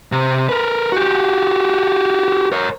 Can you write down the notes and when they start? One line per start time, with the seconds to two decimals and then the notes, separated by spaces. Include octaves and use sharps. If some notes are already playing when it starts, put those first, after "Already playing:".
0.12 C3
0.49 A#4 B4
0.92 F#4 G4
2.52 A#4 C#5